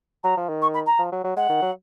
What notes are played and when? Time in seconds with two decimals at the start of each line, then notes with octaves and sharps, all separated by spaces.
0.24 F#3 A#5
0.37 F3
0.49 D#3
0.62 C#6
0.74 B5
0.86 A#5
0.99 F3
1.12 F#3
1.24 F#3
1.36 G#3 F#5
1.49 D#3
1.62 F#3